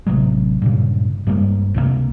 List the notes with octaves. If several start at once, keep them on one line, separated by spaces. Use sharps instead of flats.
A1 C3 F#3 G#3
G2 A#2 C#3
G2 G3 G#3 A#3
C#2 C3 E3 A#3